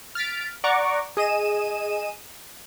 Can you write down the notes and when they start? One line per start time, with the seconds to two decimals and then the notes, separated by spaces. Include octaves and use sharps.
0.15 F6 A6 B6 D7
0.64 D5 F#5 A#5 C#6 D6
1.17 G#4 D#5 D#7 E7